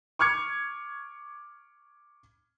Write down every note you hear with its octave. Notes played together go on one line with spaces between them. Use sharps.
C#6 D6 F6 G#6 C#7